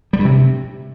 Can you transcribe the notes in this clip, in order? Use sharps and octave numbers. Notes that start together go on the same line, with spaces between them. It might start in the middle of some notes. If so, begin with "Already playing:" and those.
G3
G2
C3